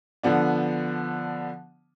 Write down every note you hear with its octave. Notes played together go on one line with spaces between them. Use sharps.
D3 F3 B3 D4